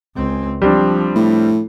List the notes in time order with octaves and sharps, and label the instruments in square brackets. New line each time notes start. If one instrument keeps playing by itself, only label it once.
[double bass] C#2 C4
[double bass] F3 [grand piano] G3 C4 D4
[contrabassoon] A2